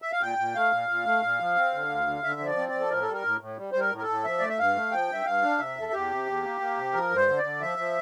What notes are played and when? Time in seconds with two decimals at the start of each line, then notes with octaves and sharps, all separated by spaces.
0.02 E5
0.12 F5
0.21 A#2 G5
0.38 A#2
0.55 A3 F5
0.72 A#2
0.89 A#2
1.05 A3
1.23 A#2
1.40 F3
1.56 C4
1.73 D3
1.90 D2
2.07 D3
2.24 D3 E5
2.41 F3 D5
2.57 C4
2.69 D5
2.74 F3
2.80 A4
2.91 A2 A#4
3.02 G3 A4
3.13 A#4
3.25 A2
3.41 A2
3.58 G3
3.72 G3 C5
3.80 A#4
3.92 A2
3.98 A#4
4.02 A4
4.09 A2
4.24 F3 E5
4.39 A3 D5
4.49 E5
4.59 G2 F5
4.76 A3
4.91 F3 G5
5.09 G2 E5
5.25 G2 F5
5.42 D4
5.59 C3 E5
5.77 E2 A4
5.93 E2 G4
6.09 C3
6.26 E2
6.43 A#3
6.61 A#3
6.77 C3
6.93 F3 A#4
7.10 G2
7.16 C5
7.27 D3
7.38 D5
7.44 D3
7.61 F3 E5
7.78 F3